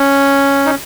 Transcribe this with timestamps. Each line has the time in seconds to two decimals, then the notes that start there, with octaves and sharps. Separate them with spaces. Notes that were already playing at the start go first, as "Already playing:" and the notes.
Already playing: C#4
0.66 D#4